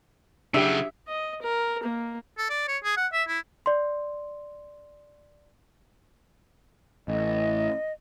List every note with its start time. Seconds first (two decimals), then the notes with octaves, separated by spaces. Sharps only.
0.54 C#3 F#3 D4 G4 E5
1.08 D#5
1.42 A#4
1.83 A#3
2.38 A4
2.50 D5
2.68 C#5
2.84 G#4
2.97 F#5
3.13 E5
3.28 E4
3.66 D5 C6
7.08 A1 D#5